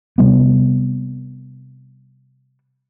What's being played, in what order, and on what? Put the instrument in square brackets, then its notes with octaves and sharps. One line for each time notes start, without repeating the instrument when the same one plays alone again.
[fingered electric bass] C3 G3 B3